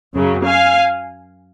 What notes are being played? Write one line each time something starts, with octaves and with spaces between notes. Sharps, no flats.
F#2 C#3 F#3
F5 G#5